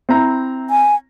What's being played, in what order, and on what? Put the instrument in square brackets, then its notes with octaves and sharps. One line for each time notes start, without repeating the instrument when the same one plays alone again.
[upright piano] C4 E4 A#5
[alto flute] G#5